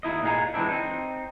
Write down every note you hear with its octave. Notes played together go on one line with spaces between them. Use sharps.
D#2 D#4 E4 D#5
A#2 D#4 G#4 A#5
E3 G#3 C4 D4 E4
C4 D#4